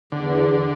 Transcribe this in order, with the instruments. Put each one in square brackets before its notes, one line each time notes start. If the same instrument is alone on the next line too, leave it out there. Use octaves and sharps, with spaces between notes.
[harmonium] E2 [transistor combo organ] D3